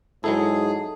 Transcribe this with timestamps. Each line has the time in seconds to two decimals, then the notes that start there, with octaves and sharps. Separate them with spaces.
0.24 G#2 F#3 D#4 E4 G#4 A4 A5